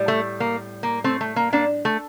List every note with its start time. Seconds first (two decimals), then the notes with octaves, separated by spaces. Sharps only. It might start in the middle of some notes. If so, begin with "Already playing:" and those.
Already playing: A2 G3
0.08 A3
0.40 A#3
0.83 A#3
1.04 A3 C4
1.21 A3
1.36 A#3
1.53 A#3 D4
1.85 A3